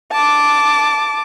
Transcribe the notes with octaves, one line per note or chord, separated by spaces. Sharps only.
A5 D6